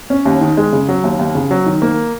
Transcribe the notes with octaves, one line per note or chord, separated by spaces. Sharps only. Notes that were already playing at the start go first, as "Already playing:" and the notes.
C#4
D#2
D#3
G#3
C#3
F#3
D#2
D#2
C#3
F#3
D#3
A#3